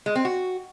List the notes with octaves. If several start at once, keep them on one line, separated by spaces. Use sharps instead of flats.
G#3
C4
F#4